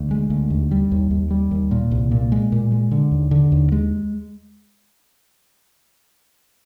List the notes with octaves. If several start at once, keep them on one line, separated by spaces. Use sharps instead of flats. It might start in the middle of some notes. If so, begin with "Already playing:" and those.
Already playing: D2
G#3
D2
D#2
G3
D#2
D#2
G3
D#2
A#2
C2
A#2
G#3
A#2
G#3
D3
D#2
D3
D#2
G#3